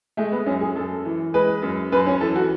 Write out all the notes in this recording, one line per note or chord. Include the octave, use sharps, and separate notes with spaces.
G#3 A3
B3
F#2 C#4
G#4
F#2 A4
E3
G#3 B4
F#2
F#2 B4
C#4
E3 A4
F#4